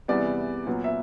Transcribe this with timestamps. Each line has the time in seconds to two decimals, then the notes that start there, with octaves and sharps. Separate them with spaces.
0.08 E2 C3 E3 G3 B3 D5
0.66 A#2 F#3 B3
0.84 E5